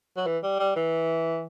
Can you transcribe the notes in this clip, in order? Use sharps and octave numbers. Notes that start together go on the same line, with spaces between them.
F#3
E3
G3
G3
E3